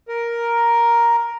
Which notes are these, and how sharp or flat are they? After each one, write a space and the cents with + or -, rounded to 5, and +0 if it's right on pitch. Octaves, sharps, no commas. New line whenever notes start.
A#4 +5